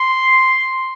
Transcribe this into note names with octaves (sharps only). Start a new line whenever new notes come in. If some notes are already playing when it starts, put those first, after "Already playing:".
Already playing: C6